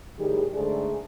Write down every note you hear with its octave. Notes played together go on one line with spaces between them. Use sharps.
A2 D#3 G3 G4 G#4
G#2 D3 A3 G#4 A4 D5